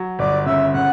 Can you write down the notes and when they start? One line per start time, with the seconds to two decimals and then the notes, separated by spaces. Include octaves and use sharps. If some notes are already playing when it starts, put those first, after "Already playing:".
Already playing: F#3
0.19 G1 D5
0.46 C#3 E5
0.74 C#3 F#5